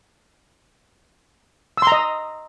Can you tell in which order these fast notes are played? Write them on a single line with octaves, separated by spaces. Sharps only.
E6 C6 A#5 D#5